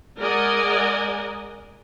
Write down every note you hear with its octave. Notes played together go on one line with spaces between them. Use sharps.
G#3 A#4 D5 D#5 F#5 G#5